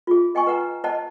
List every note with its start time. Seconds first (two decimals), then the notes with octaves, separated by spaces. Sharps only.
0.07 F4 G#4
0.35 D#5 G5 G#5 C#6
0.47 B4 F#5 A#5
0.84 C5 D#5 F#5 A5